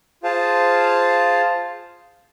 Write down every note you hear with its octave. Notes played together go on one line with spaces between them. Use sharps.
F4 G#4 C5 F5 A5